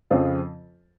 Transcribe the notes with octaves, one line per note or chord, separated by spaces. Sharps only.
F2 C#3 F3 C4 F4